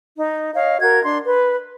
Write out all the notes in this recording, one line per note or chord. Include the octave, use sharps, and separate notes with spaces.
D#4
C#5 D#5 F5
F#4 A#4 G#6
D4 C6
B4